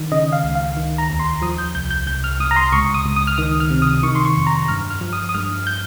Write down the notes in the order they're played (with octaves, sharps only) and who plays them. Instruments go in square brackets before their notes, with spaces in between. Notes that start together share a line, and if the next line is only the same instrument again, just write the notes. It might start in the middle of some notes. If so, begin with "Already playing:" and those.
Already playing: [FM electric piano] D#3
C#3 D#5
F5
C#2
F5
D#3
A#5
D#2
C6
F3 D#6
G6
C2 G6
G6
C2 G6
F6
C2 D#6
A#5
C6
C#2 C#6
D#6
C#2
D#6
F6
D#3 D#6
F6
C3
D#6
D#3 C#6
C6
C#6
F2
A#5
G2 F6
F6
F3
D#6
D#6
G2 F6
G6